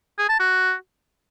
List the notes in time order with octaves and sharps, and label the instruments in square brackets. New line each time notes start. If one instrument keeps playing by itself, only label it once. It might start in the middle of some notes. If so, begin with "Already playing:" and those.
[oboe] G#4
A5
F#4